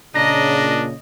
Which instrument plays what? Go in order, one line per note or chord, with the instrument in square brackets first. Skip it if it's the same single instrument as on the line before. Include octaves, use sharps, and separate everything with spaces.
[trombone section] A#2 C#3 [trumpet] D4 [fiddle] D#5 [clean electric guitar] A#5